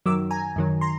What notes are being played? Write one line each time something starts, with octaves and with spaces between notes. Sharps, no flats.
F#2 D#3 F#3 D6 E6
G#5 A#5
F#2 D#3 F#3
A#5 C6